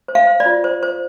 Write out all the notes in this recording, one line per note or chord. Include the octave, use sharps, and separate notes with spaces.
C5
F5
C5
D5
F4
C5
C5